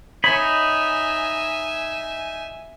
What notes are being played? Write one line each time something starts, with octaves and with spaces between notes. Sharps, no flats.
D#4 C#5 E5 G#5 B5